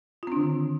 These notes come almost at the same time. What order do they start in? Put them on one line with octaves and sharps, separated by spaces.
F4 C4 D4 D3 D#3